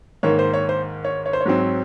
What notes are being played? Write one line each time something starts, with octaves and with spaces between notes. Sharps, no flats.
G#2 D#3 A#3 C#5
C5
C#5
C5
C#5
C#5
C5
C#5
G#2 F#3 C4